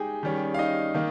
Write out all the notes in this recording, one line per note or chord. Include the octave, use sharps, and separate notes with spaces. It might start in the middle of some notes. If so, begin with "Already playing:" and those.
Already playing: G#3 D#4 G4 G#4 G5 G#5
D#3 G3 C#4
F5
D#4 D#5
D#3 A#3